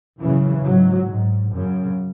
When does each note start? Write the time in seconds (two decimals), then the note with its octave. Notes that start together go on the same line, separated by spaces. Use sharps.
0.19 F#2 C#3 E3
0.63 G#2 F#3
1.07 G#2
1.51 F#2 C#3